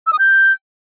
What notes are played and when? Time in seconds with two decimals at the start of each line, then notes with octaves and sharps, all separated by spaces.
0.07 E6
0.13 D#6
0.19 G6